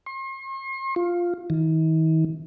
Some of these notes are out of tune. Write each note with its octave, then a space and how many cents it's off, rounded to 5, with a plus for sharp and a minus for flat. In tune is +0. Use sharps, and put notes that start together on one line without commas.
C6 +45
F4 +0
D#3 +45